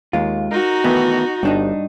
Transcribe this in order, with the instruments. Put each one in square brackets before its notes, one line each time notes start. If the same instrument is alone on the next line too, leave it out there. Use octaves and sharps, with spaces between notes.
[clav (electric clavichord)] D#2 [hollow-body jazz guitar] G#3 F4
[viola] D#4 F#4 [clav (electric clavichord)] A#4
[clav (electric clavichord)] D#3 E3 A3 [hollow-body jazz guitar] B3
[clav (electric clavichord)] G1 G5 A5 [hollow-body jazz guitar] G2 D4 D#4